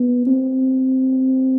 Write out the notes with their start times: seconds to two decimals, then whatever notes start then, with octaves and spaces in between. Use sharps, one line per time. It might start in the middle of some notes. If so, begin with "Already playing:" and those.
Already playing: B3
0.27 C4